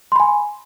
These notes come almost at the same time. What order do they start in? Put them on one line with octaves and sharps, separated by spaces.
C6 B5 G#5